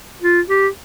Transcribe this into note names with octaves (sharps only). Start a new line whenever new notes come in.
F4
G4